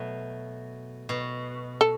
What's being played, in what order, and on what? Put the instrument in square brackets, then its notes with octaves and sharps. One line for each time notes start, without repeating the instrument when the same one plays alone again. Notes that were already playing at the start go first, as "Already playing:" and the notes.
Already playing: [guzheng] B2 F#3 A3
B2
[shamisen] A4